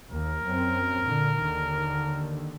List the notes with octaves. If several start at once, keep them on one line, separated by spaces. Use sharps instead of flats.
D#2 A#4
F#2 C4
A#2 D3
D#2 D3 D#3